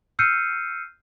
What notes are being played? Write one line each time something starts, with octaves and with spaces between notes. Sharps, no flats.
E6 F6 G6 C7 C#7 D#7